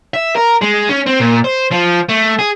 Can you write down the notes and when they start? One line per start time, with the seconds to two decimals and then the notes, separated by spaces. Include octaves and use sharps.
0.14 E5
0.36 A#4
0.62 G#3
0.89 C#4
1.06 C4
1.20 A#2
1.44 C5
1.71 F3
2.09 A3
2.39 G#4